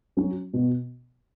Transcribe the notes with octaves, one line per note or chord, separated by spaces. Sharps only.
F#3 C#4
B2